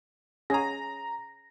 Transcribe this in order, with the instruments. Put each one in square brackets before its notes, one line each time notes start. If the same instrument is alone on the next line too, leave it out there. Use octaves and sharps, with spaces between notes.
[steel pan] C#4 G#4 [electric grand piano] A#5 A#6